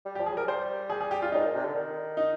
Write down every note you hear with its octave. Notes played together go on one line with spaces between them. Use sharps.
G3
G4
F3
G#4
G3 A#4
G3 C5
G3 G#4
G#4
G4
F4
G#2 D#4
A#2
C3
D3
D#3
D#4